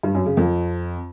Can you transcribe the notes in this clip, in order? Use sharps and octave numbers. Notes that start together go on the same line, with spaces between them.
G2
F#2
C#3
F2